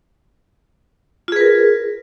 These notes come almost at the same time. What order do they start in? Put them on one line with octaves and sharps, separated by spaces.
F4 G#4 B4 A#4